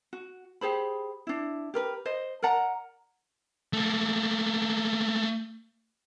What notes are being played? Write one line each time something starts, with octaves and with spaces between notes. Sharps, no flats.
F#4
G4 G#4 C5 B5
D4 E4
G4 A#4 B4
C5 D#5
A#4 D5 F#5 A#5
A3 A#3